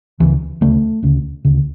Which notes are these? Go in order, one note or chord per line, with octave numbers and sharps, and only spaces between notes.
D2 C#3 E3
D2 C#3 A3
D2 C#3
D2 C#3